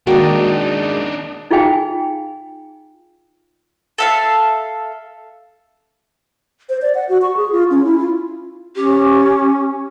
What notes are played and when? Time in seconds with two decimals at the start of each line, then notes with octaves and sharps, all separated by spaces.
0.07 D#3 G#3 A#3 D4 D#4 F#4
1.51 D#4 F4 G#4 F5 G5 G#5
3.98 A4 E5 F5
6.69 C5
6.82 D5
6.95 F#5
7.09 F#4
7.22 C#6
7.37 G#4
7.52 F4
7.71 C#4
7.85 E4
7.98 F4
8.76 C#4 G4